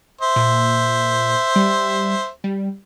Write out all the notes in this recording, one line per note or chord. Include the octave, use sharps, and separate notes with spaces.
C5 E5
A#2
G3
G3